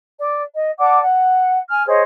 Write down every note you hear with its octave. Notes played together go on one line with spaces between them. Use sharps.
D5
D#5
D5 F#5 A5 D6
F#5
G#5 F6
G#4 C5 C#5 D#5